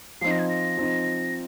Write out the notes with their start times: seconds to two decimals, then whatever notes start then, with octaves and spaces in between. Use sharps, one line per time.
0.21 F3 C4 D#4 C7
0.31 A#6
0.39 G#6
0.49 A#6
0.77 F3 C4 D#4